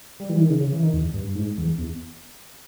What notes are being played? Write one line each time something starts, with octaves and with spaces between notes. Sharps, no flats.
G3
E3
D#3
C#3
C#3
E3
D#3
E2
G2
G#2
E2
E2